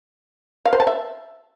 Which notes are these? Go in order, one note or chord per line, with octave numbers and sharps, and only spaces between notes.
F5
C5
A5
E5